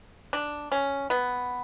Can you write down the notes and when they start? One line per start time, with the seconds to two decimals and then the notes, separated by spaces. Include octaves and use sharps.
0.33 D4
0.72 C#4
1.10 B3